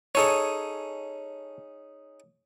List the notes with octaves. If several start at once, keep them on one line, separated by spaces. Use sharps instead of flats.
C#4 D#4 G#4 A4 C#5